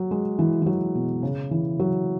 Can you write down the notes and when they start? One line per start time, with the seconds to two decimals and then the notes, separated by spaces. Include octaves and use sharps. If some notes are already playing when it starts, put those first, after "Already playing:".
Already playing: F#3
0.11 G#3
0.39 E3
0.62 E3
0.66 F#3
0.95 B2
1.23 C#3
1.51 E3
1.79 F#3